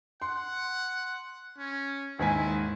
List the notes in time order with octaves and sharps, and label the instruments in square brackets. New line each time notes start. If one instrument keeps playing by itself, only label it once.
[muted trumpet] F#5 [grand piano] C6
[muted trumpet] C#4
[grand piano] D#2 G#2 G#5 [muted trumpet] E4